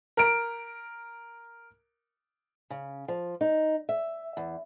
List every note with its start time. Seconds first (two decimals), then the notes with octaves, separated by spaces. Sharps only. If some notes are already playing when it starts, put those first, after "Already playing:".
0.17 A#4 D7
2.70 C#3
3.08 F3
3.41 D#4
3.89 E5
4.37 E2